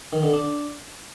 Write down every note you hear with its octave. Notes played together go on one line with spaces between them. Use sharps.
D#3
D3
D4